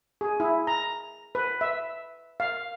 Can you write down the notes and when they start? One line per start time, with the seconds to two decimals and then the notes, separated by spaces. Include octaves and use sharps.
0.21 G#4
0.40 E4
0.67 A#5
1.35 B4
1.61 E5
2.40 F5